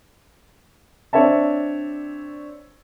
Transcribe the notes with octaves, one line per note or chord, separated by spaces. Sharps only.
C4 D4 C#5 D5 E5 A5